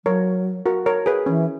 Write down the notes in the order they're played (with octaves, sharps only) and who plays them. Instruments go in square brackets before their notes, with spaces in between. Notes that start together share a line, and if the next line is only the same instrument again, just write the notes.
[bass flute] F#3 [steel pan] A#4 C#5
[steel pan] F#4 A#4
A#4 C#5
G#4 B4
[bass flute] E3 [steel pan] C#4